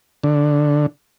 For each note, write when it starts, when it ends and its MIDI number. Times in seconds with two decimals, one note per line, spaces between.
0.24 0.86 50